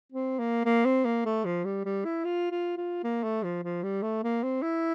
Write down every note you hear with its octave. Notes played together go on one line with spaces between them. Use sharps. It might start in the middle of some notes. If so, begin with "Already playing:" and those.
C4
A#3
A#3
C4
A#3
A3
F3
G3
G3
E4
F4
F4
F4
A#3
A3
F3
F3
G3
A3
A#3
C4
E4